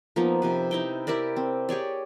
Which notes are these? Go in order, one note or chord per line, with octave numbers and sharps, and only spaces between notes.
F3 A#3 B3 D#4
C3 F3 B4
D#4 E4 G5
E4 G4 A#4 D5
C4
G4 G#4 C#5 D5